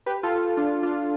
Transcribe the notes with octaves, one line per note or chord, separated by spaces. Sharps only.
G4 B4
F4 A4
D4 F4
D4 F4